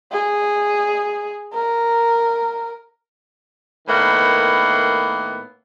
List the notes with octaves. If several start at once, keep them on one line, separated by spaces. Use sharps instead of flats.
G#4
A#4
A2 D#3 A#3 B3